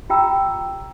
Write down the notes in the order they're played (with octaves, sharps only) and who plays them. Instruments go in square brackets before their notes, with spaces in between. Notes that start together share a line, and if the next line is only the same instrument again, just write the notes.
[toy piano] F4 G4 G5 A#5 E6